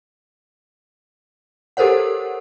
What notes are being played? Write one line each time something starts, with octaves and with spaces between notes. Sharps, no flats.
G4 A4 A#4 C5 C#5 F#5